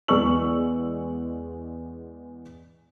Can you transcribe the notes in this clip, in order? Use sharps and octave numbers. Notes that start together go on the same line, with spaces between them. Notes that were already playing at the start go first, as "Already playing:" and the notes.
E2 G#3 D5 C#6 E6 F#7